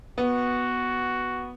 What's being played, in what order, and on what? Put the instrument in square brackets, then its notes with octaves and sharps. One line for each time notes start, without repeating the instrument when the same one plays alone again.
[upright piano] B3 [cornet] F#4